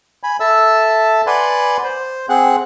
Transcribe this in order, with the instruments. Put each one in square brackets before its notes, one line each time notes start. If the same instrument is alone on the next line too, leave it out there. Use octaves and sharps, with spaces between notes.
[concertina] G#5 B5
A4 E5 A5 E6
B4 D5 F#5 G#5 B5 C6
C5
C4 G#4 F#5